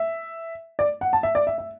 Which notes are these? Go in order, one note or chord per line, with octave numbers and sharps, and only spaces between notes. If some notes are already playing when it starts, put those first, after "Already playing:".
Already playing: E5
D5
F#5
A5
E5
D5
E5
E5